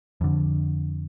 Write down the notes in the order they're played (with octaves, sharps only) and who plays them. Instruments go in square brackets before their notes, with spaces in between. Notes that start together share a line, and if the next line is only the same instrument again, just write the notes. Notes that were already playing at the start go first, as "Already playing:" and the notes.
[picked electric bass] F2 D3